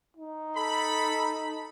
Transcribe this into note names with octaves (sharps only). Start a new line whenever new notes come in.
D#4
A4 B5